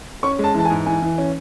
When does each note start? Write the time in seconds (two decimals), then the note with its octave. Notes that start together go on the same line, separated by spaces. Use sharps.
0.23 C#4 C#6
0.39 G#3
0.44 A5
0.54 E3 A5
0.65 G#5
0.70 G#2
0.86 E3 G#5
1.02 E3
1.18 C#4